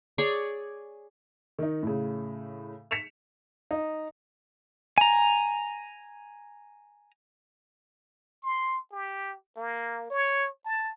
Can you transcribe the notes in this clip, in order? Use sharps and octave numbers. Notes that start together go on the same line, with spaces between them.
G#4 C#5 D5
D#3 D#4
A2 C#3
B6 C#7 E7 F7
D#4
G#5 A#5
C6
G4
A#3
C#5
A5